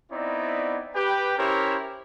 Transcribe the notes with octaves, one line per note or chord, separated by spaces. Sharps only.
B3 C4 D#4 E4 D5
G4 B4 G5
C#4 E4 G4 A#4 C5 C#5